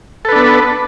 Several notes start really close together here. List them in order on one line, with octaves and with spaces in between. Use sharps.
A4 B4 D4 B3